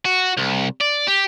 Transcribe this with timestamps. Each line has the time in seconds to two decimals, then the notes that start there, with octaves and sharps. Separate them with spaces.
0.05 F#4
0.37 C2
0.81 D5
1.07 G4